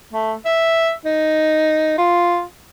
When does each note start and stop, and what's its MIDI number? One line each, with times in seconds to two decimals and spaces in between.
0.13 0.34 57
0.45 0.91 76
1.05 1.94 63
1.98 2.42 65